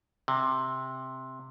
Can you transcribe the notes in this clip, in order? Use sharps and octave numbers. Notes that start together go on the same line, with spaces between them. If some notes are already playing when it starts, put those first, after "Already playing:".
C3